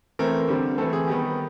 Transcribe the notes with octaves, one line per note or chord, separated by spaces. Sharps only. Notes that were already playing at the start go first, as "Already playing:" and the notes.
E3 A3 C4 A#4
D3 G3 C4
E3 A3 C4 A4
G#4
D#3 G3 B3